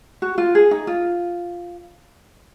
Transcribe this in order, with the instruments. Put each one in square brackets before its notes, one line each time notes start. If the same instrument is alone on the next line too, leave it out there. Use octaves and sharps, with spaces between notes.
[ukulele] F#4
F4
G#4
D#4
F4